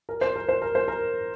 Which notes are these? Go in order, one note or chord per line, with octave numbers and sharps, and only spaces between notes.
A#4
C5
A#4
C5
A#4
C5
A#4